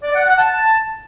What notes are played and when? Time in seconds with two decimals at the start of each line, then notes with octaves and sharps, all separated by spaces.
0.03 D5
0.14 F#5
0.26 F#5
0.38 A5